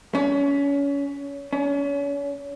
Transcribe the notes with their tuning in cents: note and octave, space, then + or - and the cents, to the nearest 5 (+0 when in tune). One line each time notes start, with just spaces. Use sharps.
C#4 +30
C#4 +35